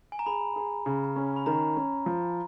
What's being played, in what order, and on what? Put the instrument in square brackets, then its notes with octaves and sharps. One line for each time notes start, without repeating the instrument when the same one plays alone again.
[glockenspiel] G#5
A#5
[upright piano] G#4 [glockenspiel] B5
[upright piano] G#4
C#3
C#4
[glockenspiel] B5
[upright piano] D#3 [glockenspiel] A#5
[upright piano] C#4
F3